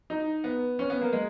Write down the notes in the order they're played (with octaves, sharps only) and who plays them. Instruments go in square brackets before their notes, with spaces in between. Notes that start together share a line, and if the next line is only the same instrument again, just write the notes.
[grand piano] D#4
B3
C#4
B3
A#3
G#3